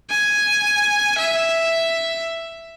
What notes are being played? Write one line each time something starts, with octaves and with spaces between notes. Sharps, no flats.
G#5
E5